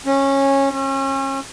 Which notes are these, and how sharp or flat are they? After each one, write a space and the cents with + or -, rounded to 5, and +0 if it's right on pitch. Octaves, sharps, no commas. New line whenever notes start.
C#4 -15
C#4 -35